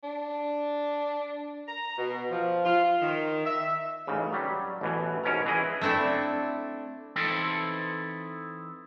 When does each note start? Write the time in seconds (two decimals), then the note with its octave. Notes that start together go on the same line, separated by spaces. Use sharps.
0.03 D4
1.68 A#5
1.98 B2
2.31 F3
2.65 F4
3.01 D#3
3.45 E5
4.07 A1 G#2 C#3
4.32 F#3 G3
4.81 A1 B2 E3
5.24 G#2 B2 C#4 A#4 A#5
5.46 E3 E4 G#4 D#5
5.81 A3 C4 D4 E4 A4
7.16 E3 C4 D#4 E4 A4 D#5